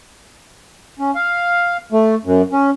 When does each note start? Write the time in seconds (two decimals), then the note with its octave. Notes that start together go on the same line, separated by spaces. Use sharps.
0.99 C#4
1.15 F5
1.92 A3
2.25 F#2
2.52 C#4